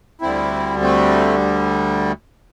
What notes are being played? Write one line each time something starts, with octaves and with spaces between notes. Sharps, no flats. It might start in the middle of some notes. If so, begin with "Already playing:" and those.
D2 D3 G3 C4 E4
A3 C4